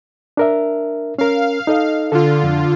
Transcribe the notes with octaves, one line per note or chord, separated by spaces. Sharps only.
D4 A#4 E5
C#4 A#4 F5
D#4 A4 D#5
D3 F4 A4
F2